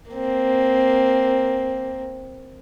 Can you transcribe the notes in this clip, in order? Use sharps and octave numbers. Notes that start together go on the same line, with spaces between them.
A#3 C4